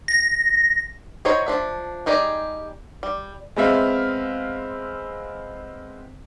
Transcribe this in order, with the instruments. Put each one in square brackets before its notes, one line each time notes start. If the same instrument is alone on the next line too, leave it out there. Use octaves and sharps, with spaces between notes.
[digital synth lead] A#6
[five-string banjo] F#3 D#4 E4 C5 C#5
F3 D4 E5
G3 D#4 G4 G#4 D5
G3
[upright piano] G#3 B3 C4 E5 F5